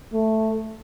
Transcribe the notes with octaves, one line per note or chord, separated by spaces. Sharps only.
A3